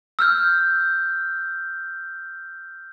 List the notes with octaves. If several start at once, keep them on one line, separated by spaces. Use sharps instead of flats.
E6 F6 G6